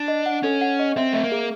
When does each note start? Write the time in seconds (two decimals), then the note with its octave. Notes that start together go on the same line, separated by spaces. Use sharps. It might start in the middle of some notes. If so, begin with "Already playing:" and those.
Already playing: D4
0.08 D#5
0.26 F#5
0.43 C#4 A4
0.61 F#5
0.79 D#5
0.97 C4 E5
1.13 A3 E5
1.24 A#3
1.32 G#4